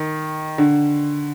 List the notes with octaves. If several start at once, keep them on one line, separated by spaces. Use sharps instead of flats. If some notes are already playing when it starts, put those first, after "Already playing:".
Already playing: D#3
D3